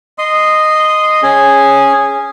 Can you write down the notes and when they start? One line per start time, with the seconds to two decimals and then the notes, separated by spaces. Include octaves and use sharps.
0.18 D#5 C6 D#6
1.23 C#4 G#4